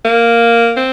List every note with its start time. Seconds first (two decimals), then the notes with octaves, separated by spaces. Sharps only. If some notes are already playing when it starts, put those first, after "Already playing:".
0.05 A#3
0.77 C4